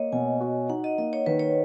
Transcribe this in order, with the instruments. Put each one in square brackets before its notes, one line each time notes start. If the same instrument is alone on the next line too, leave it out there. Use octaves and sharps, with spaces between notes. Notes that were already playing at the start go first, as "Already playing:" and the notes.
Already playing: [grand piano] A#3 [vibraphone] C#5 D#5
[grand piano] B2 [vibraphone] G#5
[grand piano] F#4
[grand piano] D#4 [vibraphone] F#5
[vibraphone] D#5
[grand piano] A#3 [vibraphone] D#5
[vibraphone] C#5
[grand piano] D#3 [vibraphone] B4
[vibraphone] C#5